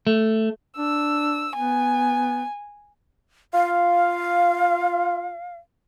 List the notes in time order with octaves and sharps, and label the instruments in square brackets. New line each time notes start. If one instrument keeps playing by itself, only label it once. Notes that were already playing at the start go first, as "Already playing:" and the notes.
[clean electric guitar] A3
[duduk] D4 [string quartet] E6
[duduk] B3 [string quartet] G#5
[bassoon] F4 [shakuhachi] F5